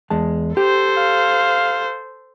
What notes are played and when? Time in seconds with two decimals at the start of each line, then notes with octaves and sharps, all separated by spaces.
0.10 E2 G#3 A5
0.57 G4 A4 C5
0.97 F5